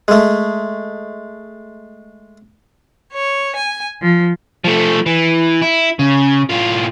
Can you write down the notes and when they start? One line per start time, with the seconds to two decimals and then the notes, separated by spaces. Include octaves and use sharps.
0.08 G#3 A3
3.13 C#5
3.56 G#5
4.01 F3
4.64 F3 A3
5.06 E3
5.62 E4
5.99 C#3
6.50 A2 F4